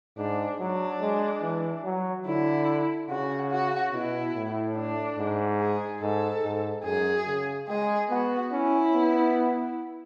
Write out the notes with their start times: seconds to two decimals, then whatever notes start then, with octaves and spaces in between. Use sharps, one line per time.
0.17 G#2 D4
0.59 F#3 D4
1.01 G#3
1.42 E3
1.84 F#3
2.26 D3 E4
3.09 C#3 F#4
3.51 F#4
3.93 B2 E4
4.34 A2
4.76 D4
5.18 G#2
5.60 G#4
6.01 G#2 A4
6.43 G#2
6.84 F#2 G#4
7.27 C#3
7.68 G#3 G#4
8.10 B3 F#4
8.52 C#4 E4
8.93 B3